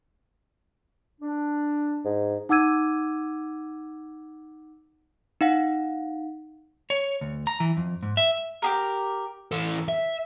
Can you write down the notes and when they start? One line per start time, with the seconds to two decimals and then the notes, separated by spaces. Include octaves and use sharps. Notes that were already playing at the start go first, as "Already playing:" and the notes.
1.21 D4
2.05 G#2
2.49 D#4 F#5 D6 E6 G#6 D#7
5.41 D#4 F5 F#5
6.90 C#5
7.21 D2
7.47 A#5
7.60 E3
7.77 F2
8.03 G#2
8.17 E5
8.62 G4 G#4 A#4
9.52 E3 A4
9.89 E5